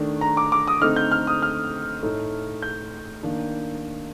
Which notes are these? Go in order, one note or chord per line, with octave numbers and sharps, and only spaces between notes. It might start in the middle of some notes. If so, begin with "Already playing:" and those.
Already playing: D#3 A3 D4
A#5
D6
D6
D#6
D3 A3 C4 D#4 F6
G6
F6
D#6
F6
A2 A3 D#4
G6
D#3 A#3 D4